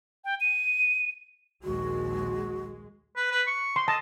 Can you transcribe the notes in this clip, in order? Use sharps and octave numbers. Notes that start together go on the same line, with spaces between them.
G5
D#7
A#1 D#2 G#3 F#4
B4
B4
C#6
C6
D#5 A5